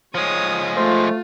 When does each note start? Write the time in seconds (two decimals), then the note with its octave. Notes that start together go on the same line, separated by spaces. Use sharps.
0.15 F3 G#3 C#5 D#6
0.76 A3 F4 C5